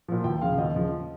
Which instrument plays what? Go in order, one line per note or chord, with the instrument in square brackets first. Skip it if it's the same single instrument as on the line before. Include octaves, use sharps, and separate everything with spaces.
[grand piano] A#2 F3
D#2 G5
C#3 F3 F5
D#2 D#5
C#3 F3